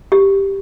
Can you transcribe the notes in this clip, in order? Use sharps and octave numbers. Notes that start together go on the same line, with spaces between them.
G4